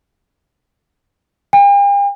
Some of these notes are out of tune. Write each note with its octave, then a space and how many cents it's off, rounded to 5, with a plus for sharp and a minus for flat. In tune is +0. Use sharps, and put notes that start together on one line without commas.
G5 +45